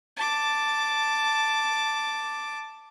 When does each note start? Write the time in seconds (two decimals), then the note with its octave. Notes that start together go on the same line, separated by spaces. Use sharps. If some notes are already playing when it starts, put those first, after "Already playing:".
0.17 A5 D6